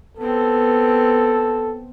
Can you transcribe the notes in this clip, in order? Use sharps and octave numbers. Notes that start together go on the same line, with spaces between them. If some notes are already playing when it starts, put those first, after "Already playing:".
B3 C4 A4